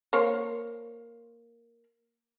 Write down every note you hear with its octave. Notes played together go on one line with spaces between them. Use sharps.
A#3 C5 C#5